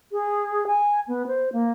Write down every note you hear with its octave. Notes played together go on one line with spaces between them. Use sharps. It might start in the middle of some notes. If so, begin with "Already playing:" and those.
G#4
G#5
B3
C5
A#3